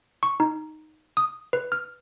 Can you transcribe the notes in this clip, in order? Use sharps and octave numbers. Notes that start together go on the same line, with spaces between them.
C#6
D#4
D#6
B4
F6